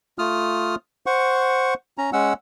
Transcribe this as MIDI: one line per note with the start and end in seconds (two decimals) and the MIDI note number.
0.19 0.75 57
0.19 0.75 65
0.19 0.75 87
0.19 0.75 89
1.06 1.74 72
1.06 1.74 78
1.06 1.74 85
1.98 2.10 61
1.98 2.10 82
2.13 2.33 56
2.13 2.33 61
2.13 2.33 78
2.13 2.33 88